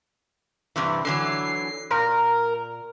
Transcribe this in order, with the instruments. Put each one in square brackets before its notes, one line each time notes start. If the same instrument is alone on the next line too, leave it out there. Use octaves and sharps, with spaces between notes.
[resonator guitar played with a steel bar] G2 C3 E3
[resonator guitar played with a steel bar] D3 E3 F#3 [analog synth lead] C7
[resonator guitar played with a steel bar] A#2 [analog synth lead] A#4